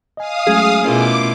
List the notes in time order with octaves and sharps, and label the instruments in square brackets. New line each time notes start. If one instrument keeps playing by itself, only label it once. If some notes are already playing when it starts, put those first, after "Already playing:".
[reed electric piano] D#5 G#5 [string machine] F5 D#6
[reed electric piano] F#3 G#3 C#4 [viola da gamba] A3 [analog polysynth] G#4
[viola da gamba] B2 E4 F4 [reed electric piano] A3 C#4 A#4 [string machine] D6